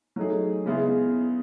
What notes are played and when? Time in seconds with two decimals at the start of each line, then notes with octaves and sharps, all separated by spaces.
0.16 F#3 A3 D#4 G#4
0.66 C#3 G#3 B3 E4 G#4